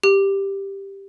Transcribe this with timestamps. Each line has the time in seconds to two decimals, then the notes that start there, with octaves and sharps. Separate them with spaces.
0.04 G4